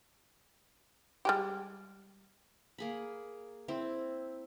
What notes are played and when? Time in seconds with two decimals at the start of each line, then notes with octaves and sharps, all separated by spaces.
1.25 G3 G#3 G4
2.78 A#3 G#4 B5
3.68 C4 E4